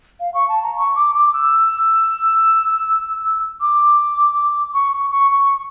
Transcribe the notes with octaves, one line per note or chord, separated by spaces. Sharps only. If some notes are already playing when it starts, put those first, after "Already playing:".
F5
C#6
A5
A#5
C#6
D6
D6
E6
D6
C#6
C#6
C#6
C#6